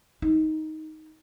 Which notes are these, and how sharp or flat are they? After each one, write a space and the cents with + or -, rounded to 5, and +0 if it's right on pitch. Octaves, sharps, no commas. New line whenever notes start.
D#4 +10